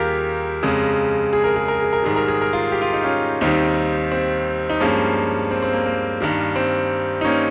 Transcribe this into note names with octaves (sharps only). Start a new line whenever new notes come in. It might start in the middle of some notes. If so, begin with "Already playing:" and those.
Already playing: D#2 D#3 G3 F4 G4 G#4 A#4
F2 C#3 G#3
G#4
A#4
G#4
A#4
G#4
A#4
G#2 D#3 G3 G#4
A#4
G#4
A#4
F4 G#4
G4
F4
D#4
C#4 F4
D#2 D#3 G3 C4 D#4
C4
D#4
G2 F3 G#3 A#3 C#4
C4
C4
A#3
A#3
G2 D#3 G3
C4
D#4
A#3 C#4